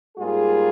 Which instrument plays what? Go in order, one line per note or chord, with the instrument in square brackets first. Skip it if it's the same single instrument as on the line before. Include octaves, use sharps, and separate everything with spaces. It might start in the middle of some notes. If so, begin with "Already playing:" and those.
[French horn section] G#2 G3 A#3 F4 G#4